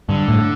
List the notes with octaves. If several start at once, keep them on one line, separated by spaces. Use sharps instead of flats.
G2 D3
A2